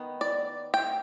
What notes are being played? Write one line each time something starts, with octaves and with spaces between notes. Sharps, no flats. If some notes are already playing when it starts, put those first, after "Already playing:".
Already playing: D#3 B3 D#4
D5
G5